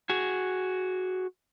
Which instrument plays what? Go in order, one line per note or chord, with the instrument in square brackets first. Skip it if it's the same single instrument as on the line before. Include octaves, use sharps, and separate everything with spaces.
[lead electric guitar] F#4 G#4